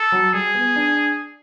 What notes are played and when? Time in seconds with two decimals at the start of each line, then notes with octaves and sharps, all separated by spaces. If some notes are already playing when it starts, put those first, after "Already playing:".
Already playing: A4
0.12 F#3
0.33 G3 G#4
0.55 B3
0.76 D4